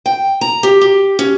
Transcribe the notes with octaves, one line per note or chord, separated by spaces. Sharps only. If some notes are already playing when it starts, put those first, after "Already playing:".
G5
A#5
G4
G4
C#4